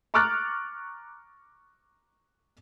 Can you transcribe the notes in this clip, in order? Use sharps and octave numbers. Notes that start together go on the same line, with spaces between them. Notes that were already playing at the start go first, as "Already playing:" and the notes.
A#5 C#6 D6 F6 F#6 A6